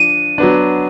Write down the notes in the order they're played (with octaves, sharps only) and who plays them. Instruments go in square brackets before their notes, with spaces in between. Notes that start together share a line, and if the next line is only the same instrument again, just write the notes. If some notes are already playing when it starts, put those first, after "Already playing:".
Already playing: [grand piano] F3 D4 [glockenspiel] D#7
[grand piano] F#3 B3 D4